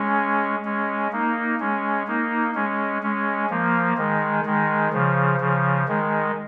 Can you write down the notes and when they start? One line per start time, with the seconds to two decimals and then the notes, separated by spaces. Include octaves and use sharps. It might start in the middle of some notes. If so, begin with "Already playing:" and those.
Already playing: G#3 C#4
0.65 G#3 C#4
1.12 A#3 D#4
1.60 G#3 C#4
2.07 A#3 D#4
2.55 G#3 C#4
3.03 G#3 C#4
3.50 F3 A#3
3.98 D#3 G#3
4.46 D#3 G#3
4.93 C#3 F3
5.41 C#3 F3
5.88 D#3 G#3